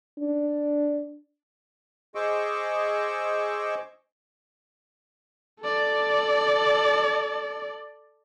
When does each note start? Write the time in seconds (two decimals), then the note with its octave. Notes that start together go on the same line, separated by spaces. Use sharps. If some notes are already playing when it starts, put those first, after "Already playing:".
0.19 D4
2.15 G#4 C5 D#5 C#6 D6 E6
5.61 A4 D5